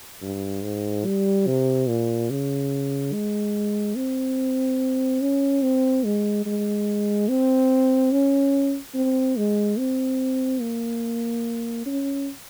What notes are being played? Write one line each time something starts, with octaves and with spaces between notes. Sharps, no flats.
G2
G#2
G3
C3
A#2
C#3
G#3
C4
C#4
C4
G#3
G#3
C4
C#4
C4
G#3
C4
A#3
C#4